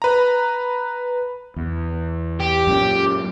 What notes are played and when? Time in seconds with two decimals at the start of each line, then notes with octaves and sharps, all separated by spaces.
0.02 B4 A#5
1.56 E2
2.40 G4
2.67 F#2 A#2